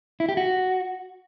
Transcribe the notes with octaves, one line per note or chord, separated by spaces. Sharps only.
E4
G4
F#4